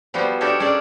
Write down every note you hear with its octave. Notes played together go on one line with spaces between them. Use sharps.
F3 G3 B3 F#4 C5
D4 D#4 G4 A4 A#4 C#5
C#4 D4 G#4 A4 D5